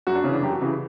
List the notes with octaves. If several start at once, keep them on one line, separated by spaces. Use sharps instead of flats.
F#2 F#4
D4
C#3 E3 C#4
D4
F#2 G4
F#4
C#3 E3